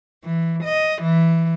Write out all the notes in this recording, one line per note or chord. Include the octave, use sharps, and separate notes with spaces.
E3
D#5
E3